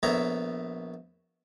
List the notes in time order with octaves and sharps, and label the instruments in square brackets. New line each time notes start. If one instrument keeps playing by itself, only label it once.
[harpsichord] A#1 A3 B3 C#5 E5 A#5